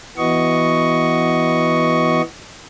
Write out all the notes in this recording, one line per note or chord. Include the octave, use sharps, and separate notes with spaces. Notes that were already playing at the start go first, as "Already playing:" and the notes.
E3 B3 F#4 D#5 C#6